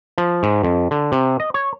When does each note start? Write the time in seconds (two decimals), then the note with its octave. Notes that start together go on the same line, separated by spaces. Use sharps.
0.18 F3
0.43 G#2
0.63 F2
0.91 D3
1.12 C3
1.40 D#5
1.54 C#5